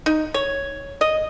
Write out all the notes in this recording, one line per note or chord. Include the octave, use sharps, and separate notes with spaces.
D#4
C#5
D#5